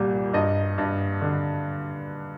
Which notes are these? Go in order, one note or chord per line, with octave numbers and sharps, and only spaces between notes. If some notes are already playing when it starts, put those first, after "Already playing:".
Already playing: C2 A#2 G3
G2 D#5
G2
D3